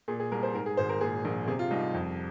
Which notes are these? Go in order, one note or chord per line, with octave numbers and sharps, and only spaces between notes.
A#2 G#4
G#4
C2 A#4
C5
G#2 A#4
G#4
G#1 C5
A#4
A#2 G#4
A#1
C3 G#4
F4
C2 D#4
F2